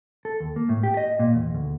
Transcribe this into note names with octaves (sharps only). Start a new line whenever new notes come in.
A4
D#2
A#3
A2
G4
D#5
A#2
E2
D2